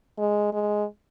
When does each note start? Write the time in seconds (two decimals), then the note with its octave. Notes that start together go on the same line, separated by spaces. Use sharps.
0.18 G#3
0.53 G#3